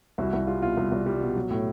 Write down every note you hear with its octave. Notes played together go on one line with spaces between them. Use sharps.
C2 E4 F#4
C2 E4
G3 F4
B2 F4
C2
C2
G3
B2
F#3
A2